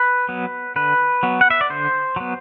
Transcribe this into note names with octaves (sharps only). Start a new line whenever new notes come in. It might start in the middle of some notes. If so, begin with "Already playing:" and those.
Already playing: B4
F#3 B3
D3 B4
F#3 B3
F#5
E5
D5
D3 C5
F#3 B3